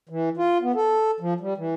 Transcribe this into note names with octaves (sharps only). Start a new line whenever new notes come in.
E3
F4
B3
A4
F3
G3
E3